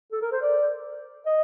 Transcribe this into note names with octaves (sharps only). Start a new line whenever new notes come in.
A4
A#4
C5
D5
D#5